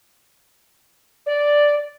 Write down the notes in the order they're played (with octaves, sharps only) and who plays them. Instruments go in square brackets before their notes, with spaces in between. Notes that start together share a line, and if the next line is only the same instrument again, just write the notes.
[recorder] D5